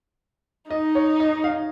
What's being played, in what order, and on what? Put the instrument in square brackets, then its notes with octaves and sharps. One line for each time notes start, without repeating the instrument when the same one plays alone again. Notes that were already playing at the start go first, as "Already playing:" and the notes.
[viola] D#4 [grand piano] D#5
[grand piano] C#5
D#5
F5